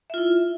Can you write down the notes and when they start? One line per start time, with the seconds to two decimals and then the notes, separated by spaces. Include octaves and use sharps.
0.10 E5
0.14 F4
0.18 E4